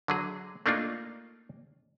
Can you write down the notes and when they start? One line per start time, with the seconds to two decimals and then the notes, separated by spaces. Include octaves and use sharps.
0.08 D3 F#3 G#4
0.66 A3 A#3 D4 D#4 F4